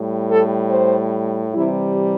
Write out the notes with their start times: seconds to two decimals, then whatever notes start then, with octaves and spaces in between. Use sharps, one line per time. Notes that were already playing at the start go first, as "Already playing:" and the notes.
Already playing: A2 G3
0.30 A4
0.71 C5
1.54 C3 E3 G3 E4